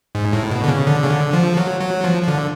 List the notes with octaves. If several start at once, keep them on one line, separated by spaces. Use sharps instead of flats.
G#2
A2
B2
D3
C#3
D3
C#3
D3
F3
F#3
F#3
F3
F3
D3